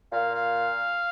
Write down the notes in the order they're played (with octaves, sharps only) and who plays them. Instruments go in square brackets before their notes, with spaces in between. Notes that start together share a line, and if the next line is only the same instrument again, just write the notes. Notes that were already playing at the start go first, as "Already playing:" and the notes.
[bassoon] A#2 [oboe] F5
[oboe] F5